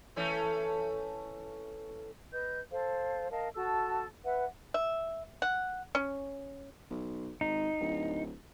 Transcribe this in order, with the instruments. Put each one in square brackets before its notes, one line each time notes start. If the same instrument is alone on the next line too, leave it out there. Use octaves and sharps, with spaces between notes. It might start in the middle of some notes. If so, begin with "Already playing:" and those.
[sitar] E3 A3 C#4
[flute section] B4 D#5 G6
A4 C5 F5
A#4 D#5 F5 A5
F#4 A4 A5 E6
B4 E5 F#5
[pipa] E5
F#5
C#4
[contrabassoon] B1
[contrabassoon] G#1 [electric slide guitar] D#4
[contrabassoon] D1